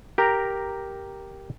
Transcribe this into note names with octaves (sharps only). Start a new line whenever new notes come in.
G4 A#4 A#5